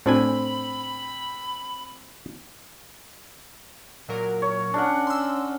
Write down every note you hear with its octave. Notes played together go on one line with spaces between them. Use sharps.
A2 C4 D4 G#5 B5
A#2 F#3 A#4
C#5
C#4 D4 A#4 F#5
C6 E6